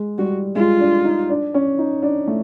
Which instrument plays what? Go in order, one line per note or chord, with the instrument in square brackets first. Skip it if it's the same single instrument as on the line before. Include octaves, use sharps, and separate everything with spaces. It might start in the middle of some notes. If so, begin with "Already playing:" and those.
Already playing: [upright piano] G#3
[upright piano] G3 [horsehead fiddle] F#4
[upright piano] G#3 [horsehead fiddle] F4
[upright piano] D4
D#4
D4
C#4
D#4
D4
A3